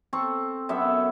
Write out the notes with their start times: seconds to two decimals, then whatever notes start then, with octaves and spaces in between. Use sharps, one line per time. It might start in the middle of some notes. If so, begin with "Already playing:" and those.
0.13 C4 A4 C#6
0.69 F#2 B3 A4 E5